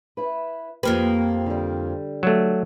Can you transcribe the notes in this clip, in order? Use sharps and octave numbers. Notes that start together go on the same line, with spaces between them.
E4 B4
F2 F3 A#3 G4 B4
D3 G3
F#3 A3